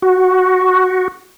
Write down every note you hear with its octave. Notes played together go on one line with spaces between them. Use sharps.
F#4